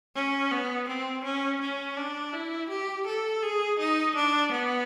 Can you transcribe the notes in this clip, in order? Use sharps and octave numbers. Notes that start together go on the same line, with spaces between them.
C#4
B3
C4
C#4
C#4
D4
E4
G4
A4
G#4
D#4
D4
B3